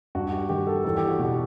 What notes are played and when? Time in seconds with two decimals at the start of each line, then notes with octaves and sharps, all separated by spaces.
0.15 G2 F#4
0.32 G4
0.49 D#3 G4
0.67 A4
0.84 E2 A4
0.97 G4
1.09 F#4
1.19 B2 G4